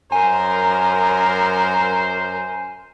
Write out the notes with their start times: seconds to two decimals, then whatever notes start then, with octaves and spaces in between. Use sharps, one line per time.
0.12 F#2 A#4 C5 G#5